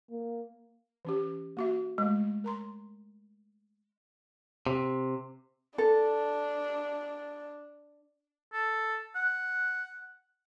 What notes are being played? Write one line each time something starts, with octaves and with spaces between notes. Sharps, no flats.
A#3
E3 C#4 G4
A#3 F#4 E5
G#3 A3
A#4 A#5 C6
C3
D4 A4
A4
F#5